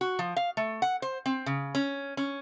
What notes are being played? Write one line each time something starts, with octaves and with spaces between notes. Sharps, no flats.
F#4
F3
F5
A3
F#5
C5
C4
C#3
C#4
C#4